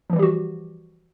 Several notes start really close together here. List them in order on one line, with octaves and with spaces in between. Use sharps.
F3 E3 G3 G4 F#4